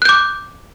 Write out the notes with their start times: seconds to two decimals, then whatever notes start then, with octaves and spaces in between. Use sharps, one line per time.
0.02 F#6
0.05 G6
0.09 D6